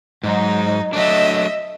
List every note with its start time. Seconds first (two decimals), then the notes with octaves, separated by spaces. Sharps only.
0.24 G#2 F#3 D#4
0.93 F#3 A3 D4 D#5 E5